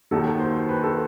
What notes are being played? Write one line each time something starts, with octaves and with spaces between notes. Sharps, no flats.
D#2 D#3 F#3 A4
C5
B4
A4